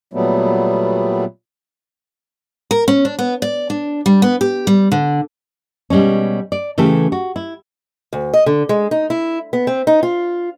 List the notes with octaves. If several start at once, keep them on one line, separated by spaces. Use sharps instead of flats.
A#2 F#3 G3 A3 B3
A#4
C#4
D4
B3
D5
D4
G3
B3
G4
G3
D3
B2 G3 G#3 C#4
D5
C#3 E3 A3 G4 A4
F#4
E4
D2
D#5
D3
G#3
D#4
E4
B3
C4
D#4
F4